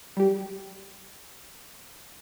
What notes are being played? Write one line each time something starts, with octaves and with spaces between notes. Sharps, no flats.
G3 G4